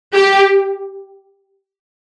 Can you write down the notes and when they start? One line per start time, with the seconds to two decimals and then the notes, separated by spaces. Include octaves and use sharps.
0.13 G4